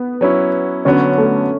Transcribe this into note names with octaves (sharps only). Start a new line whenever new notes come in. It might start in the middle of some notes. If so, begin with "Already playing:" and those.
Already playing: B3
F#3 C#4 E4
D3 F#3 B3 C#4
A3